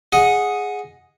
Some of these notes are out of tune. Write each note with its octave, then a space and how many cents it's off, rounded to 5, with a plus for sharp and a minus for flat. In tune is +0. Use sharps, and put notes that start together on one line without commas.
G#4 +0 D#5 +5 F#5 -15